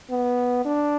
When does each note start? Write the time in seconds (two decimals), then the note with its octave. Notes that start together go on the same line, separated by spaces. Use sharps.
0.10 B3
0.65 D4